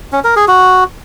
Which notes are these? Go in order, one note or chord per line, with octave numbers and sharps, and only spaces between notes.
C#4
A#4
G#4
F#4